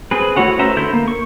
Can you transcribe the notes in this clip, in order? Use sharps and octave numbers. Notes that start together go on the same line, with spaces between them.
C4 G#4 B4
A3 E4 F#4 C#5 F#5
C#4 B4 C5 E5 A#5
D3 A3 E4 G6
A#3
C#6